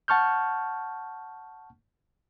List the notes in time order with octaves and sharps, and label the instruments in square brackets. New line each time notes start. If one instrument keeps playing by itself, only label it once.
[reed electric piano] F#5 A5 C#6 F6 G6